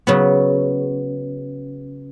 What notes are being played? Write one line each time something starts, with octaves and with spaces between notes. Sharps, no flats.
C#3 F#3 B3